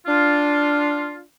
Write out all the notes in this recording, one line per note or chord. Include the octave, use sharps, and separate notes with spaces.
D4 F4